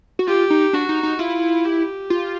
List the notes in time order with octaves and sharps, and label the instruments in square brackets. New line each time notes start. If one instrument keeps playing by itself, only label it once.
[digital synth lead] F#4
[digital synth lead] F4 [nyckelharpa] G4
[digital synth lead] D#4
[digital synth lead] D4 [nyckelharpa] F#4
[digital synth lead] D#4
D#4
[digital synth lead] E4 [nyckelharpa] F4
[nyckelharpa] G4
[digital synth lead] F4